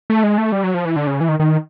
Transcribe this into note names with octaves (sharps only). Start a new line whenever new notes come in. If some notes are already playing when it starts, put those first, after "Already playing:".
A3
G#3
A3
G3
F#3
F3
E3
D3
C#3
E3
D#3
D#3